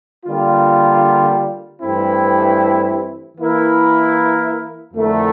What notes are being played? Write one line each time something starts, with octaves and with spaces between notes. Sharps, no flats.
D3 G3 A#3 F4
G2 E3 A3 C4 E4
E3 A#3 E4 A#4
F2 D3 A3 E4 A#4